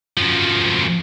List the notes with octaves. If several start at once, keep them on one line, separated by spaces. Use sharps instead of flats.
F#2 F3